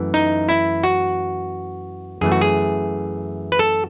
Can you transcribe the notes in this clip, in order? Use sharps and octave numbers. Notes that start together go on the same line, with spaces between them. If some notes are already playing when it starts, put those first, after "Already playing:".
Already playing: F#2 E3 A3
D#4
E4
F#4
F#2 E3 A3 G#4
F#4
G#4
B4
A4